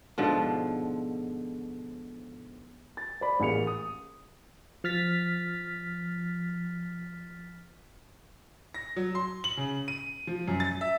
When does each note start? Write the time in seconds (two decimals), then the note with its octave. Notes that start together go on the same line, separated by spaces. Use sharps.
0.18 G#2 B2 D3 F3
2.97 A6
3.21 C5 D5 B5
3.40 A1 A#3 G#4 F5 C#7 F7
3.67 D#6
4.84 F3 F6 A6 B6
8.74 A#6
8.96 F#3
9.15 C6
9.44 F#7
9.57 C#3
9.88 D#7
10.27 F3
10.48 F#2
10.60 A6
10.81 E5